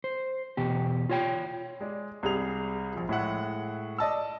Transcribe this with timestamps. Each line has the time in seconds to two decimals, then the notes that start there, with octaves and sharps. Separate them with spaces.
0.04 C5
0.57 E2 B2 G4
1.09 F4 C#5 G5
1.81 G#3 D5
2.23 C2 G3 G#4 F7
2.93 A#1 F3
3.09 A2 G#3 E5 F#5
3.98 D5 D#5 A5 E6